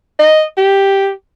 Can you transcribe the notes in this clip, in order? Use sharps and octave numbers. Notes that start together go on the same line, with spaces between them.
D#5
G4